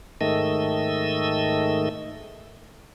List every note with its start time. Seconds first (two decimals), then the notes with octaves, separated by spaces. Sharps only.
0.21 G#2 D#3 A3 D#5 E6